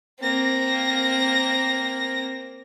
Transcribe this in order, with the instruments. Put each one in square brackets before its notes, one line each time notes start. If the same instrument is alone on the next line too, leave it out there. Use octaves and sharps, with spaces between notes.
[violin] A#3 A#6 [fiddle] C4